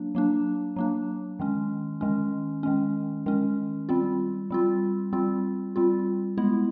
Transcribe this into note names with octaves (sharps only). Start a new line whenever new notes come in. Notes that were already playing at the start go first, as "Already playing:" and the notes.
Already playing: F#3 A#3 D4
F#3 A#3 D4
F#3 A#3 D4
D#3 G#3 C#4
D#3 G#3 C#4
D#3 G#3 C#4
D#3 G#3 C#4
G3 C4 F4
G3 C4 F4
G3 C4 F4
G3 C4 F4
G#3 B3 E4